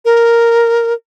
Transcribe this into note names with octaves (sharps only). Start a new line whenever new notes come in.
A#4